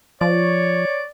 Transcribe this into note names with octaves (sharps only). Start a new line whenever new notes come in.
F3 C#5 D5